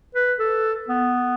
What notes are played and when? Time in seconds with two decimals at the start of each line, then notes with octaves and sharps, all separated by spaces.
0.15 B4
0.39 A4
0.88 B3